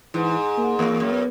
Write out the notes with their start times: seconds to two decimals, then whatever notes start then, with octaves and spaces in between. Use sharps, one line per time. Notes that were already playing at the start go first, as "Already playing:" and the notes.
0.14 G#2 E3
0.57 A#3
0.79 E2 A#3
1.00 F#2
1.11 B3